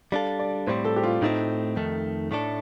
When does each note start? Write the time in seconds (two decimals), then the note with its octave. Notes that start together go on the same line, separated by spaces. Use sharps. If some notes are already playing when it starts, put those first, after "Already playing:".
0.12 G3 D4 A4 F5
0.39 D5
0.67 A2 G3 C4 C5
0.85 A4
0.96 G4
1.04 F4
1.22 A2 A3 C4 D#4
1.76 F2 D#3 A3
2.31 A2 A3 D4 A4